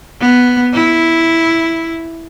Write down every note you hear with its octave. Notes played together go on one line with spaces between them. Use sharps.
B3
E4